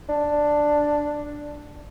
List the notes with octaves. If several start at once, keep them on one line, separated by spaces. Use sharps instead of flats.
D4